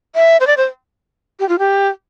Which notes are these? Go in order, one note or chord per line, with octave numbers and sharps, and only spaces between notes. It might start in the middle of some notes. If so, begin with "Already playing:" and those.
E5
C5
D5
C5
G4
F4
G4